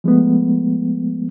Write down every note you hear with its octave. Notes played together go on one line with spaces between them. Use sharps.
F3 G#3 A3 B3